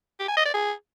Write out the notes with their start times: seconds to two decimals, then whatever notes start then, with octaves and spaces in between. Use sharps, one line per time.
0.20 G4
0.28 G#5
0.37 D#5
0.45 D5
0.54 G#4